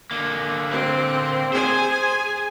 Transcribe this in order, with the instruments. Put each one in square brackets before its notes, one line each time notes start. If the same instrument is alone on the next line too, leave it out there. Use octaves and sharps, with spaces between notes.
[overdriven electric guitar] D3 A#3
[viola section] C4
[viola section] G#4 G#5 [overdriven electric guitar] C5